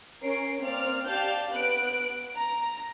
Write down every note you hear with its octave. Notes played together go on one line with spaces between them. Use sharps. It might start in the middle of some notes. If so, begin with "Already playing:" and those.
C#4 A#4 C7 D7
A#3 C4 D5 F6
G4 D5 F5 A5 G6
B3 F#6 D7
A#5